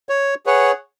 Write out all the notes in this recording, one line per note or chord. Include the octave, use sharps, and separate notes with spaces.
C#5
G#4 B4 C#5 F#5